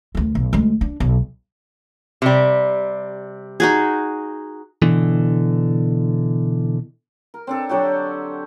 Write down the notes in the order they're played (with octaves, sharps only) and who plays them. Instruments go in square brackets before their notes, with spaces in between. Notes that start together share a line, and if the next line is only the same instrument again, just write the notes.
[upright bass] D2 D#3
B1
D2 G#3
D4
B1
[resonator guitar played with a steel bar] C3 G3
[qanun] D#4 F#4 G#4
[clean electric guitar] B2 D3 E3
[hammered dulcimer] A#4
C4 D4 A4
D3 F#3 F#4 G4